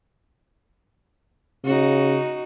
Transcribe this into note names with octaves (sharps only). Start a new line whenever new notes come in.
C#3 D#4 F#4